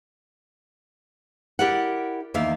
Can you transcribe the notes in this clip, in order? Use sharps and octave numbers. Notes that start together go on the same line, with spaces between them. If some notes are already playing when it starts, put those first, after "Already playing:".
E4 G4 A#4 D5 F#5
E2 D#3 A#3 E5 F5